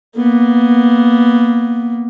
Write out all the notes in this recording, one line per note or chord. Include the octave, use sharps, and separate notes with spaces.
A#3 B3